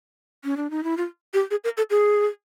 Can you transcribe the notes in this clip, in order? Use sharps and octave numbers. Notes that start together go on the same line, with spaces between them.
C#4
D4
D#4
E4
F4
G4
G#4
A#4
A4
G#4